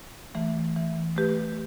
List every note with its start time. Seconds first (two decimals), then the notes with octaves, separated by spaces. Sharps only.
0.35 E3 A3
0.76 E3
1.17 A3 G4 B4